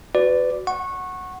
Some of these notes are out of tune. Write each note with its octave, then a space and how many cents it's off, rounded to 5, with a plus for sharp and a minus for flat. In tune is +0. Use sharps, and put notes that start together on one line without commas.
F#4 +0 B4 +25 D5 +0
F#5 +0 C#6 -20